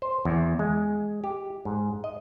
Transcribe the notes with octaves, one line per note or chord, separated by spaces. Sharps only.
C5
E2
G#3
G4
G#2
D#5